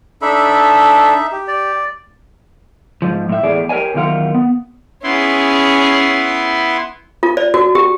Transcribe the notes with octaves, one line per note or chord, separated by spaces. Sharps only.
D4 D#4 A4 E5 B5
G4
D5
G#2 F3
A2 E5
E2 A2 G#4 D5
G4 A#4 C#5 D5 G#5
E2 D#3 F#3 F4 A#4 F#5
B3
B3 C#4 E4 G#4 C6
F4
D5
F#4
G4